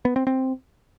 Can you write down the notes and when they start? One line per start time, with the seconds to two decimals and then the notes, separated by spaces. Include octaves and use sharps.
0.05 B3
0.16 C4
0.27 C4